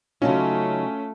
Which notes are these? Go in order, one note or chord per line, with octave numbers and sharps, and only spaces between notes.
C#3 F#3 A3 C#4 D#4 F4